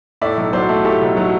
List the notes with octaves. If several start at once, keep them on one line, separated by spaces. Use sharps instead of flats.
A2 D5 E5
B1
F#3 C5 D5
A3
A2 G4 A4
B1
F#3